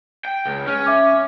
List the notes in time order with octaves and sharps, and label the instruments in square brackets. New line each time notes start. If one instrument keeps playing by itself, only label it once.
[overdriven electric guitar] G5
C#2
[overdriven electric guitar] C#4 [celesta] F6
[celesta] E5 D6